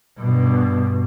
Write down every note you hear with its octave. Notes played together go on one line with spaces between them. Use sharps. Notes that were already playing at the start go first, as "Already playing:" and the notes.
G2 B2